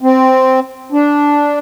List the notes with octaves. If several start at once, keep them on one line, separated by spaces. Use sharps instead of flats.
C4
D4